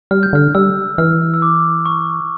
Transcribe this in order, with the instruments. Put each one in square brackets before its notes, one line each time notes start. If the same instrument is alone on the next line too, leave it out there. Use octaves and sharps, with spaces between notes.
[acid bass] G3 [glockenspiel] F6
[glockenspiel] G6
[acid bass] D3 [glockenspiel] F6
[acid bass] G3 [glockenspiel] E6
[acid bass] E3 [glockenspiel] F6
[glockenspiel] E6
D6
C#6